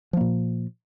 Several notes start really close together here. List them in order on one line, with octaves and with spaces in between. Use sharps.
F3 A#3 A#2